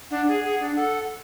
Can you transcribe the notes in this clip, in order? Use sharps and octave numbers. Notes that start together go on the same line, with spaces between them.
D4 F#5
G#4
G#4 F#5
D4
A4 F#5